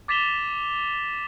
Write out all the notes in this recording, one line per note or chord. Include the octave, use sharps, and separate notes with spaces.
D6 A6 B6 E7 F7 G7